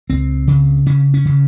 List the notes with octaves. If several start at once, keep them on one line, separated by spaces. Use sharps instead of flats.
C#2 C4
C#3
C#3 C#4
C#4
C#3